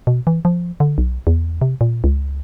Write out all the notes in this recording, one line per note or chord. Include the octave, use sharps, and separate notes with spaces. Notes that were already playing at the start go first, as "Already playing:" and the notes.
B2
E3
F3
D3
B1
E2
C3
A#2
C#2